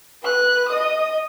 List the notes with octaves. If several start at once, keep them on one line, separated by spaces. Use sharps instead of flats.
B4 F#6
D#5 D#6